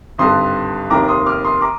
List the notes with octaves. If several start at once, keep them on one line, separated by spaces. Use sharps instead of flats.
G#1 G2 D3 C6 D#6
F1 D#2 D#3 A#5 D6
C6 D#6
D6 F6
C6 D#6
A#5 D6